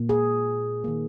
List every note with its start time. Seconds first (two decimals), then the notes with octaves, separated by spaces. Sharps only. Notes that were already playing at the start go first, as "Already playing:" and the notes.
Already playing: A#2 A#3
0.09 G#4
0.84 D#3 A#3